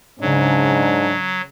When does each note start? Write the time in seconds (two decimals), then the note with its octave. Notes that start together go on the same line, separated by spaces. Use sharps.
0.21 G#2 C#3 F#3 D4